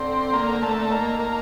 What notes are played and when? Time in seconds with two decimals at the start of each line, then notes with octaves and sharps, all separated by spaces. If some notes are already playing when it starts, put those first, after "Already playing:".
Already playing: D3 C4
0.33 A#3
0.62 A3
0.91 D#3 A#3
1.20 A#3